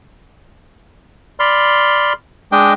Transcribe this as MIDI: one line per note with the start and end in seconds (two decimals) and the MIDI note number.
1.40 2.13 74
1.40 2.13 83
1.40 2.13 84
1.40 2.13 89
2.52 2.73 56
2.52 2.73 62
2.52 2.73 75
2.52 2.73 79